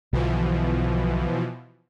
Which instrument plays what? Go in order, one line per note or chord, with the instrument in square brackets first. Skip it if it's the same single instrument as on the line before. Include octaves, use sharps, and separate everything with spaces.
[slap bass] B1 D3 [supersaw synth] B2 E3 F3